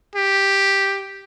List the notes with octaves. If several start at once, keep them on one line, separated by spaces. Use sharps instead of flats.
G4